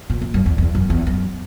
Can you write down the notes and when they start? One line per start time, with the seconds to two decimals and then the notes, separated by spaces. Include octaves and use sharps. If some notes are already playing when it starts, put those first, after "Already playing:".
0.10 A#2
0.22 A#2
0.34 F#2
0.46 E2
0.58 E2
0.75 F#2
0.90 E2
1.07 F#2